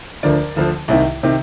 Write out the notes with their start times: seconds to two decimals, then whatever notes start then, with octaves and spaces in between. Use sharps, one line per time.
0.23 D2 D3 F3 A#4 D5
0.57 D2 D3 F3
0.88 C2 C3 D#3
1.23 C3 D#3